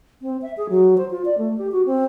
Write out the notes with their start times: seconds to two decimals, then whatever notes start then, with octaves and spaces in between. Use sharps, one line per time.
0.22 C4
0.42 E5
0.57 G#4
0.69 F#3
0.98 C5
1.11 F4
1.25 D5
1.38 A3
1.58 G4
1.72 F#4
1.86 C4